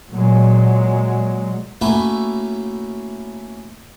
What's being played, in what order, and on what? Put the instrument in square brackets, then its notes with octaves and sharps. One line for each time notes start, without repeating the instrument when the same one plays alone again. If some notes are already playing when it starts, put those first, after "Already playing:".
[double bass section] A#2 F#3 G#3
[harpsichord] A3 A#3 C#4 E4 F#4 B4